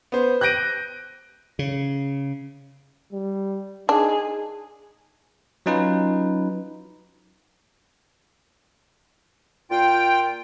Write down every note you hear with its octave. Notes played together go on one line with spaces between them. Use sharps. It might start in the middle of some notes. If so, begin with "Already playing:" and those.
B3 C5
F#6 G6 A#6 D7 D#7
C#3
G3
D4 D#4 G#4
F#3 C#4 D#4 F4 B4
A#2 F4 G5